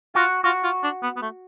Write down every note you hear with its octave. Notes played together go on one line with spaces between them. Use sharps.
F4 F#4
F4 F#4
F4
D4
B3
B3
A3